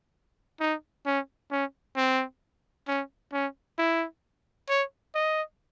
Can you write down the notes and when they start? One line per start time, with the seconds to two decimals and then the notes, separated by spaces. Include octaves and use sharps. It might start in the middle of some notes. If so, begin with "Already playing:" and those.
0.61 D#4
1.06 C#4
1.51 C#4
1.96 C4
2.88 C#4
3.33 C#4
3.79 E4
4.69 C#5
5.15 D#5